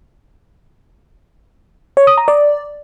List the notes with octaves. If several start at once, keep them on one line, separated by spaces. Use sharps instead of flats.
C#5
D#6
A#5
D5